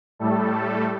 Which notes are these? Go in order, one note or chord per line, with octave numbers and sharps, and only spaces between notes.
A2 G3 A3 A4